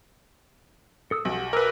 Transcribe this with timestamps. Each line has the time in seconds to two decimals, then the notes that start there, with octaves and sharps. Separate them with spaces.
1.11 A4 D#6 E6
1.25 B1 G4 F#5
1.53 A#4 B4 D6 E6